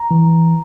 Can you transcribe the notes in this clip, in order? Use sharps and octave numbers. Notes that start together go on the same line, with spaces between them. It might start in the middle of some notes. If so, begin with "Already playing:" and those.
Already playing: A#5
E3